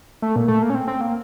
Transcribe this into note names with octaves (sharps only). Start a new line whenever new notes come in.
A3
A#2
A3
A#3
C#4
C4
C4
A#3